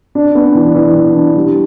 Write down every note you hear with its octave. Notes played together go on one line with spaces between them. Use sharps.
D4
B3
E3
E3
E3
D4
G3